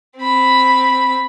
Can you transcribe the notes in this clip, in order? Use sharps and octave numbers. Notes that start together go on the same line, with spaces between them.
C4 B5